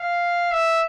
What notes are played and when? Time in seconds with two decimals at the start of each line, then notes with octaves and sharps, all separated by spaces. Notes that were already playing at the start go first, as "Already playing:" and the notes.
Already playing: F5
0.51 E5